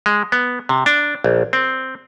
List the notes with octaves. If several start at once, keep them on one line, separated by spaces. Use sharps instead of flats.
G#3
B3
C3
D4
A#1
C4